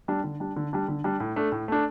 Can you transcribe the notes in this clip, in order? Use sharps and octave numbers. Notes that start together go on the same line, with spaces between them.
G3 D4
D3
G3 D4
D3
G3 D4
D3
G3 D4
A2
A3 D4
A2
A3 D4